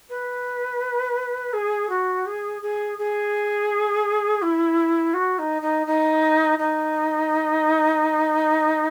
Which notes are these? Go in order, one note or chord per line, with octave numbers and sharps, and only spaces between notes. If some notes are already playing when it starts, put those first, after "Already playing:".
B4
G#4
F#4
G#4
G#4
G#4
E4
F#4
D#4
D#4
D#4
D#4